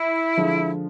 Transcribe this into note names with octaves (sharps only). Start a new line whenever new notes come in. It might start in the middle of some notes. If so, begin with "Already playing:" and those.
Already playing: E4
D3 F3 G#3